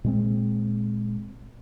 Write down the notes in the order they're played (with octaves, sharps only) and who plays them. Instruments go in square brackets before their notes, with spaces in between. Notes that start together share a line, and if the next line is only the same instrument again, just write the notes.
[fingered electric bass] A#2 G#3 C4